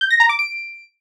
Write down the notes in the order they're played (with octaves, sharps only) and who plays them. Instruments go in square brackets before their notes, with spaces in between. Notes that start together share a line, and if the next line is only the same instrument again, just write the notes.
[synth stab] G6
A#6
A#5
D6
D7